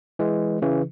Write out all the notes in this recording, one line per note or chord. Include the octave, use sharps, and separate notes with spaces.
E3 G#3
C#3 E3